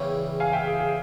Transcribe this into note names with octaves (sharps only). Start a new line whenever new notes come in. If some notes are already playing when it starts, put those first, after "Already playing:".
Already playing: E2 C#3 G3 C#4 E4 G5
F5 G#5
E5 G5
G#4
G#4